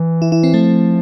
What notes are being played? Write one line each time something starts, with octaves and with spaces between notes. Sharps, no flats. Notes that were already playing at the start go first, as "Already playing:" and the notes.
Already playing: E3
E4
E4
C4
F3 A3